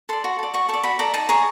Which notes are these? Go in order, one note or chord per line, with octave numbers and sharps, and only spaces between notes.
A4 D5 C6
F#4
A4 D5
F#4 C#6
A4 D5 C#6
F#4 B5
A4 D5 A#5
D#4 A5
G#4 C#5 A#5